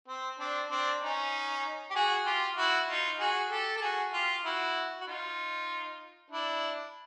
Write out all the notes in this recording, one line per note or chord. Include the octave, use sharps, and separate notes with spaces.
C4
C4 D4
C4 D4
C#4 D#4
G4
F#4 G#4
F4 G4
E4 F#4
D#4 F4
F#4 G#4
G4 A4
A4
F#4 G#4
F4 G4
E4 F#4
F#4
D#4 F4
D4 E4